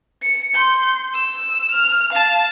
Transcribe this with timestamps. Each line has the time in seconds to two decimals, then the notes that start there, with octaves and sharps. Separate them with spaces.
0.23 C#7
0.56 C6 G6
1.15 E6
1.71 F6
2.13 F5 A5